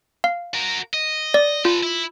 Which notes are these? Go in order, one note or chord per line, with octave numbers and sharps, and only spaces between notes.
F5
F#4 A#4
D#5
D5
F4 A4 B4
E4